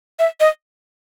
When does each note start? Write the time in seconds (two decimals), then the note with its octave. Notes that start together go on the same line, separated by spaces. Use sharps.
0.19 E5
0.40 D#5